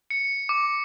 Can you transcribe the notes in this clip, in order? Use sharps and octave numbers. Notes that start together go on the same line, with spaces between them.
C#7
D6